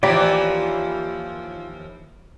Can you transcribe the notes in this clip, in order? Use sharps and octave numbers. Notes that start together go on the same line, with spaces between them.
D#2 E3 F3 F4 G4 D5 A#5 B5